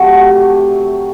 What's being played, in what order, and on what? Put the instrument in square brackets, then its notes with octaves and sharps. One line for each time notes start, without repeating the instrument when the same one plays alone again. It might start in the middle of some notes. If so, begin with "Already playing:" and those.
Already playing: [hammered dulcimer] C3 F#3 A3